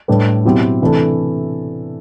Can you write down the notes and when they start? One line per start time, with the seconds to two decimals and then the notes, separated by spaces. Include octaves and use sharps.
0.08 A2 G3 D4 G4 B4
0.45 B2 F#3 C4 E4 G4
0.81 C3 E3 A3 D4 A4